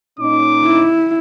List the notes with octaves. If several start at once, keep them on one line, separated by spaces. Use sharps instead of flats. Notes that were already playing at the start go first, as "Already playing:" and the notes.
A#2 C#4 D#4 D6
E4